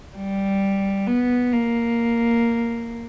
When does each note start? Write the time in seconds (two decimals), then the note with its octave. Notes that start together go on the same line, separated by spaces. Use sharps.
0.16 G3
1.07 B3
1.53 A#3